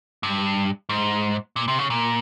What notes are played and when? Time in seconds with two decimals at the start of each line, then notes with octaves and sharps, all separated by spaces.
0.23 G2
0.89 G#2
1.56 A#2
1.68 C3
1.79 C#3
1.90 A#2